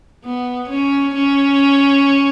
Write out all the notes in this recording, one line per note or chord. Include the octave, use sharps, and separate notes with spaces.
B3
C#4
C#4